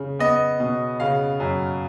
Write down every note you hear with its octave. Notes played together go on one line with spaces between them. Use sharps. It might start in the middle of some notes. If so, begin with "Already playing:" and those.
Already playing: C#3
B3 D#5
B2
C#3 F5
F#2